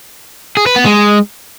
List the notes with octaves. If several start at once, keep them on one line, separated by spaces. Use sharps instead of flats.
G#4
B4
B3
G#3